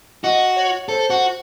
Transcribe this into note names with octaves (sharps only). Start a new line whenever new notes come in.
F#4 D#5
C#5
A4 C5
F#4